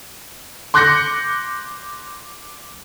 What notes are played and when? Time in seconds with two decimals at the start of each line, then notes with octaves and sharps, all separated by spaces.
0.74 C6 D6 F#6 G6 A#6 C#7